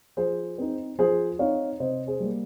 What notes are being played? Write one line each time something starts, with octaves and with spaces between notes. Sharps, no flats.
F3 G#4 C5
C4 D#4
F3 G#4 C5
C4 D#4 C#5 F5
C3 C5 D#5
G#4 C5
G3 A#3